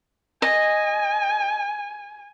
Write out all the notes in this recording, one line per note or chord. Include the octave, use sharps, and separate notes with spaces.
D#5 G#5